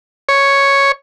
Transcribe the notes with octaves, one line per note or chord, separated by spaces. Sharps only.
C#5